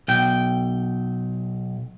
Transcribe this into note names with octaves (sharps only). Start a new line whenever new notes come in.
B1 G5